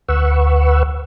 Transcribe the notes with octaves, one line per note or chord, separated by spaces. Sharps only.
D2 B4 F#5 C#6 E6